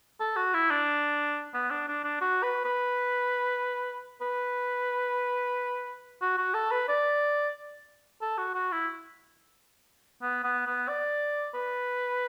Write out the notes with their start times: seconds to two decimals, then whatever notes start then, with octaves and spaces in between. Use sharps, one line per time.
0.20 A4
0.36 F#4
0.54 E4
0.70 D4
1.54 B3
1.71 D4
1.88 D4
2.04 D4
2.21 F#4
2.43 B4
2.65 B4
4.21 B4
6.22 F#4
6.38 F#4
6.54 A4
6.71 B4
6.88 D5
8.22 A4
8.38 F#4
8.54 F#4
8.72 E4
10.22 B3
10.44 B3
10.67 B3
10.88 D5
11.55 B4